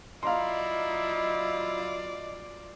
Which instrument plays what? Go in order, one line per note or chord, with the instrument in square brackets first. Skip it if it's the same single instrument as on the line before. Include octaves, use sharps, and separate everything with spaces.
[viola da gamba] F#3 F4 D5 [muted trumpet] E4 [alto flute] D#5 [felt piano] F5 A#5 C6